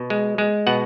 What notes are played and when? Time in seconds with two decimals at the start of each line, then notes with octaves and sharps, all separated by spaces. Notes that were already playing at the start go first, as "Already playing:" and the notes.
Already playing: B2
0.10 G#3
0.38 G#3
0.67 B2 F#5